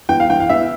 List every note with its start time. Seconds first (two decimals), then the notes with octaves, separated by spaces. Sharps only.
0.09 E3 G5
0.20 F5
0.30 E3 G5
0.40 F5
0.49 E3 E5